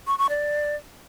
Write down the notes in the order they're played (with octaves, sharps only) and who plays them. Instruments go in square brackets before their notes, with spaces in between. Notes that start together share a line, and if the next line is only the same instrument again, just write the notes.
[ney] C#6
C#6
D5